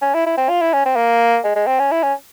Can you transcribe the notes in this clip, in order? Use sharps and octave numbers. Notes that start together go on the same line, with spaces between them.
C#4
E4
E4
C4
F4
E4
C#4
C4
A#3
G#3
G#3
C4
C#4
E4
C#4